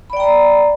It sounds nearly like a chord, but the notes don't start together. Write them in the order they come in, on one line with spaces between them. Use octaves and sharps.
B5 D5 G5 A#5